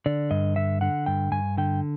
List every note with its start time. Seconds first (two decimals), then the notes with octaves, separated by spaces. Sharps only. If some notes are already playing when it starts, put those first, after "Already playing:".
0.06 D3 D5
0.31 G2 D#5
0.56 D3 E5
0.81 D3 F#5
1.06 G2 G5
1.32 G2 G#5
1.58 D3 G5